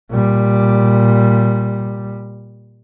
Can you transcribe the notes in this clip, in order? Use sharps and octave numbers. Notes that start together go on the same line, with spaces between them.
A#2 G3